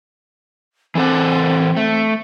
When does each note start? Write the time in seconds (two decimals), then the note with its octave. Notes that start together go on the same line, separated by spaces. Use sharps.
0.95 E3 C4 A4 F#5
1.77 A3